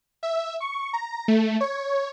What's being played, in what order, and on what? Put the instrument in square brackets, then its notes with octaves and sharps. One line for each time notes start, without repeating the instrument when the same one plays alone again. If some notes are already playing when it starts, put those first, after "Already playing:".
[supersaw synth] E5
C#6
A#5
A3
C#5